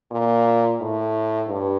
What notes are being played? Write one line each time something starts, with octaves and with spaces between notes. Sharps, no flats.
A#2
A2
G2